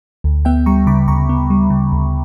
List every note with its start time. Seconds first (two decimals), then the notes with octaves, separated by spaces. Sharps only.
0.24 D2
0.45 B3 E5 G5
0.66 G3 A#5 C#6
0.87 C#3 B5 D6
1.08 D2 A#5 C#6
1.29 B3
1.50 G3
1.70 C#3
1.92 D2